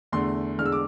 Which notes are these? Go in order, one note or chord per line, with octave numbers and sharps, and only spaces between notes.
E2 D3 A3 C6
E2 D3 G#3 F6
E6
D6